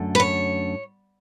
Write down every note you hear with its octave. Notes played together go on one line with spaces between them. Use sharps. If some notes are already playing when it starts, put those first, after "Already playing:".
Already playing: F#2 D3 A3
B4
C#5